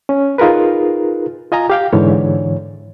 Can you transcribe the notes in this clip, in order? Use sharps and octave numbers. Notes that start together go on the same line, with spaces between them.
C#4
D#4 F4 G#4 A#4 B4
F4 D#5 G#5 A#5
G4 F5 G5
G#2 D3 E3 C#5